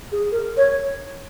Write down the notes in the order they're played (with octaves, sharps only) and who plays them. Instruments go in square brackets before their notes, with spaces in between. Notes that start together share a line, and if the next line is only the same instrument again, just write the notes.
[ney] G#4
A#4
C#5